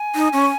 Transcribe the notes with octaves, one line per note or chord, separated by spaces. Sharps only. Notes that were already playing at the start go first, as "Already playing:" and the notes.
Already playing: G#5
D#4
C#4